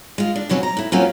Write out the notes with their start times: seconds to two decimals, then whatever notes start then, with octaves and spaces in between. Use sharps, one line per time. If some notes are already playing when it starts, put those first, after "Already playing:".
0.18 G#3 F4
0.36 D4
0.49 B2 F3 F#3 C4 C#4
0.63 A#5
0.77 A2 E4
0.92 F#3 A#3 C4 C#4 E4 F4